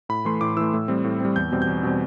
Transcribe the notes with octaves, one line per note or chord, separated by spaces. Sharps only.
A2 B5
E3 A3 C6
A2 D6
E3 A3 E6
A2
G3 C4
A2
G3 C4
E2 G6
B2 G3 C4
G6
E2
B2 G3 C4